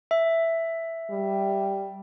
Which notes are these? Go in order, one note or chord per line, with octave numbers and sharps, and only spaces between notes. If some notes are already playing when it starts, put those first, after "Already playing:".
E5
G3